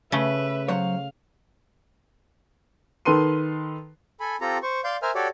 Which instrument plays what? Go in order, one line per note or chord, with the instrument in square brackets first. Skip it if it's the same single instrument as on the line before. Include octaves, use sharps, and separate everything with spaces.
[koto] C#3 A3 [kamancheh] B4 E5
[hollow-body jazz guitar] F#3 C5 C#5 [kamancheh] F5
[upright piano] D#3 A4 B4 C6 D#7
[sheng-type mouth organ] A4 G#5 B5
C4 F4 G4 A4 A#5
C5 C#6
D5 F5 C6 G6
A#4 C5 E5 G#5 F6
F#4 G4 A4 C#5 D5